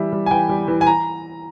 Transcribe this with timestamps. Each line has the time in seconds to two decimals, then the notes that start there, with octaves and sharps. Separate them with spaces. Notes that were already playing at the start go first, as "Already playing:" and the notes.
Already playing: E3 G3 E5
0.12 G3
0.26 G#5
0.31 E3 G5
0.49 G3
0.68 E3
0.81 G#5
0.87 A#5